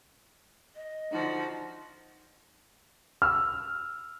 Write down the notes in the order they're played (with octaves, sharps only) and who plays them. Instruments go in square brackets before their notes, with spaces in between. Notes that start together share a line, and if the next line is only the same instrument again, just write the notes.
[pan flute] D#5
[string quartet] D3 F3 F#4 [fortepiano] D#4
[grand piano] E6 F6